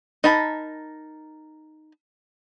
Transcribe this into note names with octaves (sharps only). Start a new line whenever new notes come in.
D#4 A#4 A5 B5